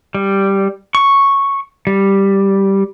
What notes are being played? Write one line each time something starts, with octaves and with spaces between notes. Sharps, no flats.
G3
C#6
G3